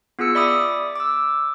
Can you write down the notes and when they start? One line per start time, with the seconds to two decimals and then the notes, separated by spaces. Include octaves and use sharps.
0.19 B3 F4 G#4 E6 C#7
0.35 D5 E5 B5 D6 D#6
0.96 D6 E6